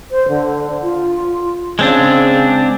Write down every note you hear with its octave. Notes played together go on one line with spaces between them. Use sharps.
C5
D3
F4
C#3 G#3 C4 D4